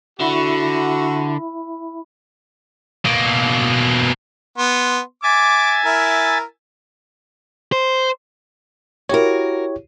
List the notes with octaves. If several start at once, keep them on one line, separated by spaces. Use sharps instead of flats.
D3 E4 F#4 E5 B5
B2 A#3
B3 C6
E5 G#5 D6 A6
E4 A#4
C5
E4 F#4 G4 A#4 C#5